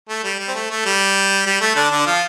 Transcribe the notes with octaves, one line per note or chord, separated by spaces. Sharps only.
A3
G3
G3
C4
A3
A3
G3
G3
A3
D3 D4
D3 D4
F3 F4